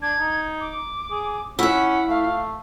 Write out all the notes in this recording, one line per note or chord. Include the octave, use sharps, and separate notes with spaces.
D4 G#6
D#4
D6
G#4
C#4 E4 E5 F#5
A3 F5